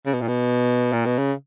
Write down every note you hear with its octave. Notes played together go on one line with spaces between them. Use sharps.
C#3
B2
A#2
B2
A#2
B2
C#3